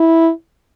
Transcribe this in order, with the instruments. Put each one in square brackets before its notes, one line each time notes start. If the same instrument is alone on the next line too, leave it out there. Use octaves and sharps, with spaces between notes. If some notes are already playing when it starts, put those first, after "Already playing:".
Already playing: [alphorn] E4